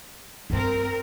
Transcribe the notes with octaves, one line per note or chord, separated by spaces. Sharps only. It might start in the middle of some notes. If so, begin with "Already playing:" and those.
G2 C4 F4 A#4